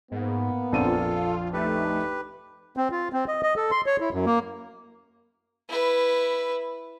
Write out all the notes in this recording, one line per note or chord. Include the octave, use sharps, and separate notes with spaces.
G#2 A#3 B3
A#1 F2 F4 A4 D#7
A3 D#4 G4 B4
C4
F4
C4
D#5
D#5
A4
C6
C#5
E4
F#2
A#3
E4 B4